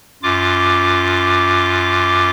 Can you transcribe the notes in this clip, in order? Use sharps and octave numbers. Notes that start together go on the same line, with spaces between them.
F#2 F4 D6